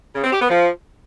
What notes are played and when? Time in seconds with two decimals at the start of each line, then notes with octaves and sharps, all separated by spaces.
0.15 C#3
0.23 C4
0.32 G4
0.40 B3
0.49 F3